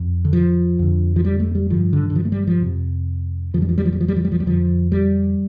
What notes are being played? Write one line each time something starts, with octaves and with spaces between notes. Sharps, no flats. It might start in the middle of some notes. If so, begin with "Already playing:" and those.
Already playing: F2
D3
F3
F2 D3
F3
G3
A3
G3
G2 D3 F3
D3
D3
F3
A3
G3
F3
F2 C3
F2 D3 F3
G3
F3
G3
F3
G3
F3
G3
F3
G3
F3
G3
F2 D3 F3
G3